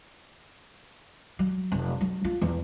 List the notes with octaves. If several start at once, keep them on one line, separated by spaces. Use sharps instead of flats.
F#3
F1
F#3
F4
E2